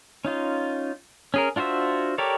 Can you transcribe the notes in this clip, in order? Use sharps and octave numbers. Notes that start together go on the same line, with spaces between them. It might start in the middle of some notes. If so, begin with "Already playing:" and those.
C#4 D#4 F4
C#4 G#4 A#4
D4 F4 F#4 C5 E5
G4 A4 A#4 C#5 D5